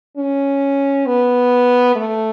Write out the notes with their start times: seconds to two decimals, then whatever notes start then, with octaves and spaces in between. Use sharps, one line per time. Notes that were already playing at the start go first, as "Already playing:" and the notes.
0.17 C#4
1.06 B3
1.96 A3